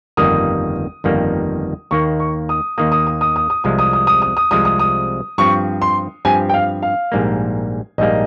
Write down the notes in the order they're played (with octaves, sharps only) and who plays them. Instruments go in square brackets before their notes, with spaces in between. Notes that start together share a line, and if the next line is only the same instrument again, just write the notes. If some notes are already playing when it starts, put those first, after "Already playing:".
[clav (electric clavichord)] G1 F2 D#3 G3 A#3 [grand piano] D#6
[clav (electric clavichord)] G1 F2 D#3 G3 A#3
[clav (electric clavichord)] D#2 D#3 A#3 [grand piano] C#6
[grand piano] C#6
D#6
[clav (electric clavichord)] D#2 D#3 A#3 [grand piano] D#6
[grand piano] D#6
D#6
D#6
D#6
D#6
[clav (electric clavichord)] C2 C3 F3 G#3 [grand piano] D#6
[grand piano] D#6
D#6
D#6
D#6
D#6
[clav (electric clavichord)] C2 C3 F3 G#3 [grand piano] D#6
[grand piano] D#6
D#6
[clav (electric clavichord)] G2 F3 C4 G4 [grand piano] C#6
[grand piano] C6
[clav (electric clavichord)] G2 F3 C4 G4 [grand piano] G#5
[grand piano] G5
F5
F5
[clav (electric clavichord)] A#1 G#2 G3 A#3
[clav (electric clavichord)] A#1 G#2 G3 A#3 [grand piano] D#5